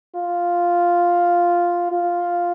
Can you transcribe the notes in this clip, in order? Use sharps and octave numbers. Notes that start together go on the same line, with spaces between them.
F4
F4